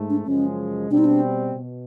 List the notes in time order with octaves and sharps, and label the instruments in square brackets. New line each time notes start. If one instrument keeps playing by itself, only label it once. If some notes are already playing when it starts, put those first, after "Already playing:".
Already playing: [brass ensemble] G#2 A3
[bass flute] D4
[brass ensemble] F#2 C#3 F3 G#3 [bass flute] C#4
[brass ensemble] B2 G3 C4 [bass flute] D4
[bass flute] D#4
D4
[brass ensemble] B2